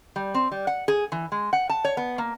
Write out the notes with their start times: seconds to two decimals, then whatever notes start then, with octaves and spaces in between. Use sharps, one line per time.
0.16 G3
0.34 C4
0.52 G3
0.67 F#5
0.88 G#4
1.12 E3
1.32 G#3
1.53 F#5
1.70 A5
1.85 C#5
1.97 B3
2.18 A#3